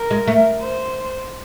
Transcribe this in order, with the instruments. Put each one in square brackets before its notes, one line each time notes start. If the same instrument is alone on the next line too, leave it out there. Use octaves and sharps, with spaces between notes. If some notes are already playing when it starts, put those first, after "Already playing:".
Already playing: [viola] A#4
[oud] G#3
A3
[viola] C5